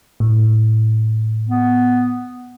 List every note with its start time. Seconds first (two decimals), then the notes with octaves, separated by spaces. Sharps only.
0.20 A2
1.48 B3